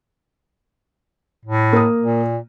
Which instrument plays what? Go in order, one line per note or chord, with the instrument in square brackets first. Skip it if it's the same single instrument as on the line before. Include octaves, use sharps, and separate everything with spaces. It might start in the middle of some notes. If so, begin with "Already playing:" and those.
[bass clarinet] A2
[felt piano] A#3 A#5 D#6
[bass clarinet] A#2